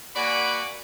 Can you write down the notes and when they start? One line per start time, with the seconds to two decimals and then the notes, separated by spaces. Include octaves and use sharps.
0.16 A#3 F#4 D5 F#5 G#5 B5